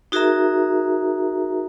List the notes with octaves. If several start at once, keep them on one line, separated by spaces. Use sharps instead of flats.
D#4 F#4 G#4 A#4 E5 A#5